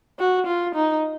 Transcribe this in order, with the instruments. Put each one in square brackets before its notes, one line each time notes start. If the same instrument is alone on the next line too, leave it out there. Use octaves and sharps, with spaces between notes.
[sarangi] F#4
F4
D#4